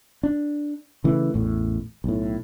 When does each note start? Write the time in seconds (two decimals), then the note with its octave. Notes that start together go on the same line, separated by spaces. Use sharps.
0.23 D4
1.04 C#3 E3 A3
1.34 A1 E2 A2
2.04 B1 A2